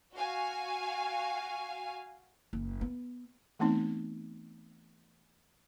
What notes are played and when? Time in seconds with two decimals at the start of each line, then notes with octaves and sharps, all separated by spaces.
0.14 F#4 F5 G#5
2.53 F#1
2.81 B3
3.59 E3 A3 B3 C4 D#4